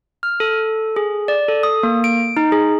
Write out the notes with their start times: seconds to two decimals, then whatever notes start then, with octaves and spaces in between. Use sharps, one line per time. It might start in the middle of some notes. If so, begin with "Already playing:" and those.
0.23 F6
0.40 A4
0.96 G#4
1.28 D5
1.48 A4
1.63 D#6
1.83 A#3
2.04 D7
2.37 D#4
2.52 G#4